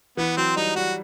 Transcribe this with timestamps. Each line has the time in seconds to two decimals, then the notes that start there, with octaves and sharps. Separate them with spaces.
0.17 E3 B3
0.37 F#3 C4
0.56 G3 D#4
0.76 G3 F#4